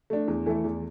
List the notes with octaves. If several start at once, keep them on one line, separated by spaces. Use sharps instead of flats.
A3 D4
E2
E3 A3 E4 A4
E2